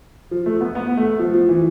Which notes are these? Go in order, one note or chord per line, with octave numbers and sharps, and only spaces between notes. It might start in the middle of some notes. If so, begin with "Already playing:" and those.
F3
A3
B3
B3
A3
F3
F3
E3